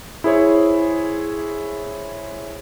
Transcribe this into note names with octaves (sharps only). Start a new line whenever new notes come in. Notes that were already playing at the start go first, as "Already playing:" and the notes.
E4 G#4 C5 C#5